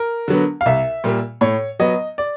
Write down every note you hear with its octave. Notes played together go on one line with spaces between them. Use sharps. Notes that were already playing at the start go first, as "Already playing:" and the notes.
Already playing: A#4
D3 F#3 B3
F5
C2 E5
A#2 G3 A#3
A2 C#5
F#3 B3 D#5
D5